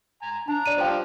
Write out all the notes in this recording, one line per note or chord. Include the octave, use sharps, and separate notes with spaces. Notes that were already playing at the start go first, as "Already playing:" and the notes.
G#5 A#5
D4 A5 A#5
D5 D#7
F3 G3 F4 C5 G5